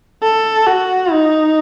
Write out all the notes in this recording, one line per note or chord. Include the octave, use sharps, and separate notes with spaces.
A4
F#4
D#4